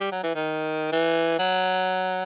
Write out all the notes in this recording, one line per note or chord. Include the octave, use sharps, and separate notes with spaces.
G3
F#3
E3
D#3
E3
F#3